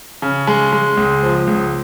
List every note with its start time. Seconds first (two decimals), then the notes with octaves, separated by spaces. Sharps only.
0.22 C#3
0.47 G#3
0.72 G#3
0.97 C#2
1.22 F3
1.47 C#2